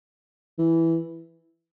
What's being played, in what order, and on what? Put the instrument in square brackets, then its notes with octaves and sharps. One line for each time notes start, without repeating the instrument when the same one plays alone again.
[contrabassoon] E3